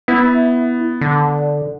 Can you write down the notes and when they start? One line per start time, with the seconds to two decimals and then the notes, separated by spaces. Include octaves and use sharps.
0.08 B3 E4
1.01 D3